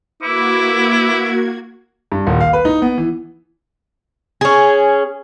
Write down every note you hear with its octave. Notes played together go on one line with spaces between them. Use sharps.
A#3 E4 F#4 B4 E5 D6 G#6
G2
D#1
F5
B4
D#4
B3
E3
C#4 G#4